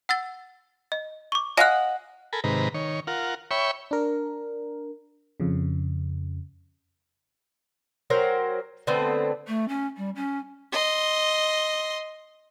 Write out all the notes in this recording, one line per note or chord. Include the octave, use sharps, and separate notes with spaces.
F#5 E6 A6
D#5
C#6 D6
D#5 F5 F#5 G#5 F#6
A4 A#4 G#5 B5
G#2 C3 D#3 B4 A#5
D#3 C#5
F4 A#4 F#5
C#5 E5 G5 B5 C#6
D4 A#4
F2 C#3
F#3 A#4 C5 G5
D3 A3 B3 C4
A3
C#4
G3
C#4
D#5 C6